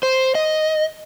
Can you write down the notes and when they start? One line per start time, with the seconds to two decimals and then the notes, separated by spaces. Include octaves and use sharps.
0.03 C5
0.35 D#5